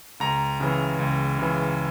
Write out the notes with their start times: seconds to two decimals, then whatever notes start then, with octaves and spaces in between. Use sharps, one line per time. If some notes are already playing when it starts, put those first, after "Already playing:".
0.20 C#2 A#5
0.60 C#3 E3
0.99 C#2
1.39 C#3 E3